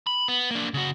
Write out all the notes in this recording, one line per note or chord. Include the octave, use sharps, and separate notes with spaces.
B5
B3
A#3 D4
C#3 F#4